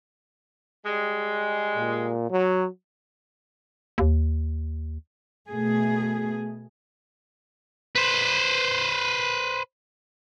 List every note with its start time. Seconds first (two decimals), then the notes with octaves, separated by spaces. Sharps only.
0.86 G3 G#3
1.76 A#2
2.30 F#3
3.98 D#2
5.49 B2 A3 G#4
7.95 B4 C5